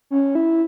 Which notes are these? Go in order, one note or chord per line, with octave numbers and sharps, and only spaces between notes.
C#4
E4